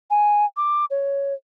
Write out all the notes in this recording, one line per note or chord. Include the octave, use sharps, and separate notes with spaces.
G#5
D6
C#5